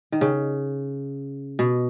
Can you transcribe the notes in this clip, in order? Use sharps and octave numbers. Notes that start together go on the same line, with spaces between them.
D#3
C#3
B2